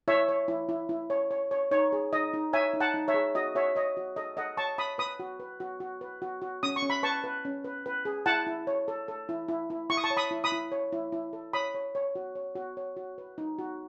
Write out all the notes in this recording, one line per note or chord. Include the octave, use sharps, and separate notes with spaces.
E4 C#5 E5
C#5
E4
E4
E4
C#5
C#5
C#5
D#4 C#5
G#4
D#4 D#5
D#4
C#5 E5 G#5
D#4
F#5 A5
D#4
C#5 E5
G#4
F#4 D#5
F#4 C#5 E5
C#5 D#5
F#4
A4 D#5
A4 D#5 F#5
C#5 A5 C#6
C#5 B5 D#6
B4 B5 D#6
F#4
B4
F#4
F#4
B4
F#4
F#4
C#4 D#6
C#6
C#4
B5
B4 A5 C#6
B4
C#4
B4
B4
G#4
E4 F#5 A5
E4
C#5
A4
A4
E4
E4
E4
E4 C#6
D#6
A5 C#6
C#5
B5 D#6
E4
B5 D#6
E4
C#5
E4
E4
A4
C#5 B5 D#6
C#5
C#5
F#4
C#5
F#4
C#5
F#4
B4
D#4
F#4